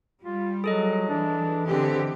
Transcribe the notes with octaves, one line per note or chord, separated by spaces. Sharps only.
G3 F4
F#3 G#4 A4 D#5
E3 D4
D3 E3 C4 G4